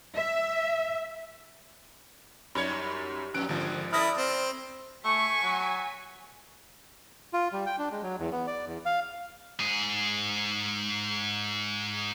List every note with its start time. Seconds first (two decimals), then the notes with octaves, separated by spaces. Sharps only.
0.15 E5
2.55 F#2 G3 D#4 C#5 B5
3.34 F2 A#2 F#3 F#6 D7
3.49 G#1 D3 F3
3.93 E4 A4 B4 D5 D#6 F6 A#6
4.17 C4
5.04 A3 G#5 C#6 B6
5.42 F#3
7.33 F4
7.52 G3
7.66 G5
7.78 D4
7.91 G#3
8.03 F#3
8.19 E2
8.32 B3
8.47 D5
8.66 E2
8.86 F5
9.60 G#2 G#4